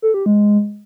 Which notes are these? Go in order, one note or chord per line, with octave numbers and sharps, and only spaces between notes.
A4
G4
G#3